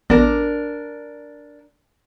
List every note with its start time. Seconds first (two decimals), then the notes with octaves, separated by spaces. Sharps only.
0.10 A1 B3 D4 A#4 D5